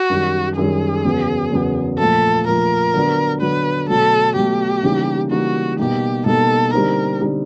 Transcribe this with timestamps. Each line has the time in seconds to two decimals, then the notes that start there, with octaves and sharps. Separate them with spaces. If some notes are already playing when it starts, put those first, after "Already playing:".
Already playing: F#4
0.10 F#2 D#3 G3
0.57 F#2 D#3 G3 G#4
1.04 E2 C#3 F#3 B3
1.51 E2 C#3 F#3 B3
1.99 A#2 F3 A3 A4
2.47 A#2 F3 A3 A#4
2.94 D3 F#3 B3 D4
3.41 D3 F#3 B3 D4 B4
3.88 B2 F#3 A3 A4
4.36 B2 F#3 A3 G4
4.83 C#3 E3 G3 A#3 D#4
5.31 C#3 E3 G3 A#3 D#4 F#4
5.78 B2 G3 A#3 D#4 G4
6.26 B2 G3 A#3 D#4 A4
6.73 D3 G3 C4 D#4 A#4
7.21 D3 G3 C4 D#4